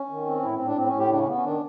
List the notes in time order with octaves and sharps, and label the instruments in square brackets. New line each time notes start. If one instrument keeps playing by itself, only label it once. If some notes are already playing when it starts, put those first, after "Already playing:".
Already playing: [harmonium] C#4
D#3
C4
A2 E4
A2 C4
D4
A2 C4
C#4
A2
G4
C#3 D4
C#4
B3
C#4
D#3 D4